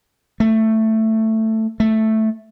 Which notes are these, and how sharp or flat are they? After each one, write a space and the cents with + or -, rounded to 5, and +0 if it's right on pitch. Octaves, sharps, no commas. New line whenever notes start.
A3 +10
A3 +0